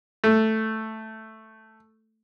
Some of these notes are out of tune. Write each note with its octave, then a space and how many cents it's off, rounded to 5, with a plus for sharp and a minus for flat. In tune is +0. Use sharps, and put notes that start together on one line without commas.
A3 +0